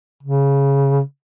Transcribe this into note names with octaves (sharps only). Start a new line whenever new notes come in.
C#3